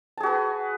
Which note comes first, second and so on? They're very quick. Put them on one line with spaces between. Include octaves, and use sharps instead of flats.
A5 G#4 F#4 B4